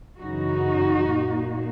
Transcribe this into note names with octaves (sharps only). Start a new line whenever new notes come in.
F#2 C#3 E3 D#4 F#4
A#2 A#3